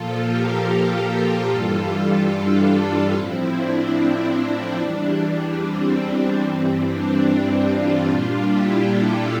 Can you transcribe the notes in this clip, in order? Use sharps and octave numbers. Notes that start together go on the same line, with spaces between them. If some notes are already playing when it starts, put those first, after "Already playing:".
Already playing: A#2 F3 F4 A4
G4 A#4
G4 A#4
G2 E3 G3 F4 A4
D4
D4
A2 F3 C4 E4
D4
C4
E2 E3 G3 D4
D4
C4
D4
G2 E3 G3 C4
D4
D4 F4
A#2 G3
E4 G4
F4 A4